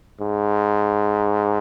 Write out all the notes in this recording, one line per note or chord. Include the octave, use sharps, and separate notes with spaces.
G#2